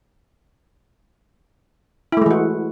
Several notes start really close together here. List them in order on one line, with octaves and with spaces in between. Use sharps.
E4 A3 G#3 E3 F#4